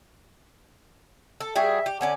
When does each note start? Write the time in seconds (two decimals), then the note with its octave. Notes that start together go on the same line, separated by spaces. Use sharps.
1.41 A4
1.56 G3 F#4 G#4 E5 G5
1.86 G4
2.01 D3 C#4 D5 F#5 G#5